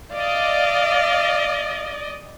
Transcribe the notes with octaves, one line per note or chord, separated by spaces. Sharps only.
D5 D#5 F5